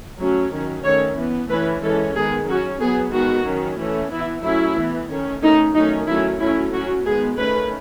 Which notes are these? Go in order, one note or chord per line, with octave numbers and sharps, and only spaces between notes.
F#3 A3 C#4
D#3 F#3 C#4
D#3 A3 C#4 C#5
E3 B3
E3 A3 C#4 B4
E3 G#3 C#4 A4
D#3 G#3 B3 G#4
F#3 C#4 F#4
F#3 B3 G#4
D#3 G#3 B3 F#4
D#3 F#3 C#4
E3 A3 C#4
E3 B3 E4
F#3 A3 C#4 E4
E3 B3
D#3 A3 C#4
D#3 A3 C#4 D#4
D#3 F#3 A3 C#4 D#4
F#3 A3 C#4 E4
F#3 A3 C#4 E4
F#3 C#4 F#4
D#3 G#3 B3 G#4
D#3 A3 C#4 B4